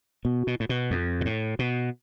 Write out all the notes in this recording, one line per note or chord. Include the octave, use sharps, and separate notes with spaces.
B2
B2
A2
B2
F2
B2
A2
B2